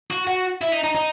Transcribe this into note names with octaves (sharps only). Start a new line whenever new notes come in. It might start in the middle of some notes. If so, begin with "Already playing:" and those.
F#4
F#4
E4
D#4
D#4
D#4